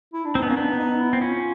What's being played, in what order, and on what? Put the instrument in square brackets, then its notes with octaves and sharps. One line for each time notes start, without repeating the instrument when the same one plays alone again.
[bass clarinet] E4
D4
[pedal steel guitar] C4 [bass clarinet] D#4
[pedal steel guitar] B3
[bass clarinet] C#4
[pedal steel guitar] A#3
[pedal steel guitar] B3 [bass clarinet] D4
[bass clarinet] D#4
D#4
E4
[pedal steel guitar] C4
[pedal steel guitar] C#4 [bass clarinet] F4